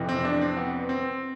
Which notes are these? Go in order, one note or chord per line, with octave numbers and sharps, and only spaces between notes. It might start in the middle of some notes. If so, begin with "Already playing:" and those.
Already playing: F2 C3 E3
C4
D4
C4
B3
C4